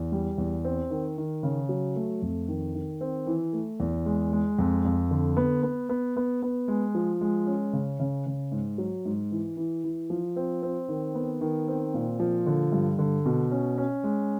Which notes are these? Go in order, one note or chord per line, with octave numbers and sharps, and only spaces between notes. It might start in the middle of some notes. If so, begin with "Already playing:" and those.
Already playing: E2
G3
E2
C4
D#3
D#3
C#3
F#3
A3
F2
D#3
D#3
C4
E3
A3
E2
G#3
G#3
F2
F2
D3
B3
B3
B3
B3
B3
G#3
F3
G#3
C#4
C#3
C#3
C#3
G#2
F#3
G#2
E3
E3
E3
F3
C4
C4
D#3
B3
D#3
C4
A#2
F3
D3
G2
D3
B2
C#4
C#4
G#3